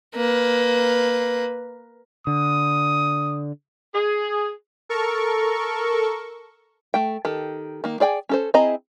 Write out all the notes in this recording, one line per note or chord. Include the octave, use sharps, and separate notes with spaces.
A#3 B4
D3 D#6
G#4
A4 A#4 C#6
A3 G5
D#3 G4 A4
D#3 A#3
G#4 D5 G5 G#5
C#4 A4 C5
C4 E4 G#4 D#5 A#5